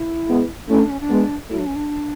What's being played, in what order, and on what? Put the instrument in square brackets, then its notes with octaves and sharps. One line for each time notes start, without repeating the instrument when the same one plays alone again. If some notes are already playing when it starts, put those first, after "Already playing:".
Already playing: [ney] E4
[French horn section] G#3 B3
[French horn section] A3 C#4 [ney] E4
[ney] D4
C#4
D4
[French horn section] G#3 B3
[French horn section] F#3 A3 [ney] E4
[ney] D4
C#4
D4